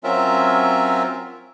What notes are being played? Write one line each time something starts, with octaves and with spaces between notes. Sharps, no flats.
F#3 C4 C#4 F4 A#4 E5